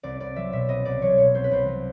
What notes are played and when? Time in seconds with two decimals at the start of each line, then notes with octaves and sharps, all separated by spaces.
0.03 C2 D5
0.20 C2 D5
0.36 F#3 E5
0.52 B2 E5
0.69 C2 D#5
0.85 C2 D5
1.02 F#3 C#5
1.18 B2 C#5
1.35 C2 C5
1.44 B4
1.51 C2 C5
1.67 F#3